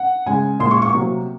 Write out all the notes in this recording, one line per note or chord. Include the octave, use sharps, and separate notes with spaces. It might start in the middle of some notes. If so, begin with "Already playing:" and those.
Already playing: F#5
C#3 G#3 G#5
A#2 G#3 C6
C#6
C#6
C3 F#3 A#3